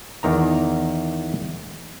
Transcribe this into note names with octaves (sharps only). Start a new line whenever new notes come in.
E2 D#3 A#5